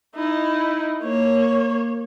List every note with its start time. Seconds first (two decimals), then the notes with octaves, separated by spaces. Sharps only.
0.15 D#4 E4
1.02 A#3 C#5